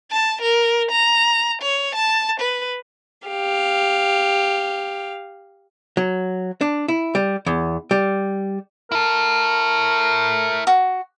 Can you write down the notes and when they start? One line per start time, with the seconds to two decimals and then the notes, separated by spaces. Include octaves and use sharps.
0.11 A5
0.42 A#4
0.91 A#5
1.62 C#5
1.95 A5
2.40 B4
3.28 G4 F5
5.97 F#3
6.61 D4
6.88 E4
7.15 G3
7.46 E2
7.91 G3
8.92 E4 A4 A#4
10.67 F#4